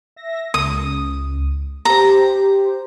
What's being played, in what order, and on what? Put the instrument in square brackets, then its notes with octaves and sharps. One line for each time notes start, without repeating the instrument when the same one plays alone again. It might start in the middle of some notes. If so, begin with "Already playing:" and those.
[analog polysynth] E5 A#6
[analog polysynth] C#2 [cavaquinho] D#6
[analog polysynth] G4 C5 [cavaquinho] A#5